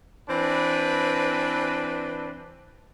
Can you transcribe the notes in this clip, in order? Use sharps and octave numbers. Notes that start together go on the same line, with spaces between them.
E3 C4 D4 B4